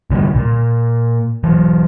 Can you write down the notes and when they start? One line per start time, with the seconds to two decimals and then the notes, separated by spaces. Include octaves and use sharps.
0.10 C2 D3 D#3 G3
0.36 A#2
1.44 E3 F#3